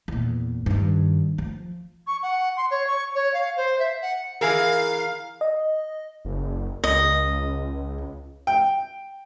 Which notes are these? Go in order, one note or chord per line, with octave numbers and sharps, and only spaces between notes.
E2 A#2
G2 D#3
F3
C#6
F#5
C6
C#5
C#6
C#5
F5
C5
E5
F#5
E3 G#4 A#4 F5
D#5
F#1
C#2 D#5
G5